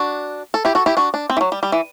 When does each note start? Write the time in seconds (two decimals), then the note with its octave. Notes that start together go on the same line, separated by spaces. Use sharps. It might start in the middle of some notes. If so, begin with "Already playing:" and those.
Already playing: D4 F#4
0.54 A4
0.65 E4 G4
0.75 F#4 A4
0.86 E4 G4
0.97 D4 F#4
1.14 D4
1.30 C4
1.37 E3
1.41 F#3
1.52 G3
1.63 G3
1.72 E3